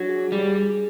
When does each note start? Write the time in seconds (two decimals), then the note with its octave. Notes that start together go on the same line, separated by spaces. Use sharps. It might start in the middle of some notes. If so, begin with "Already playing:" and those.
Already playing: F#3 D4
0.09 G#4
0.32 G3 G#4
0.56 G#4